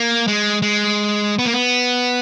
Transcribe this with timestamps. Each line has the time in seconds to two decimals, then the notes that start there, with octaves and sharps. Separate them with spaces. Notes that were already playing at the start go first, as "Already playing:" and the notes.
Already playing: A#3
0.28 G#3
0.62 G#3
1.39 B3
1.45 A#3
1.53 B3